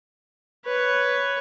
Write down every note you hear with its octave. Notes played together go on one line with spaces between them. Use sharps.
B4 C#5